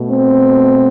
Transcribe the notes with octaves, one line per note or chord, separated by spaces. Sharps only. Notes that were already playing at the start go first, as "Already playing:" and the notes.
Already playing: B2 A3
C4